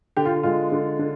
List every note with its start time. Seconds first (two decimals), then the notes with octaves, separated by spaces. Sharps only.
0.17 D3 G4
0.25 F4
0.43 G#3 F4
0.72 D3
0.99 D3